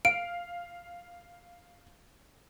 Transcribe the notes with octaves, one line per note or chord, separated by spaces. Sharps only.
F5 D7